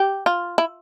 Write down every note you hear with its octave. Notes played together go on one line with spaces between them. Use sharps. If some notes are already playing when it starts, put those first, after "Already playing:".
Already playing: G4
F4
E4